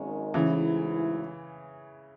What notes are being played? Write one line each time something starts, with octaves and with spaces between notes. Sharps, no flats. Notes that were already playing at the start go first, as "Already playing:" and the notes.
Already playing: G#1 F#2 D#3 G#3 C#4
A1 G#2 C#3 E3 F#3 C#4 E4